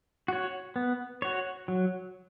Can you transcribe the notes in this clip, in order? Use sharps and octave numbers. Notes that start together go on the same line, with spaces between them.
F#4 C#5
B3
F#4 C#5
F#3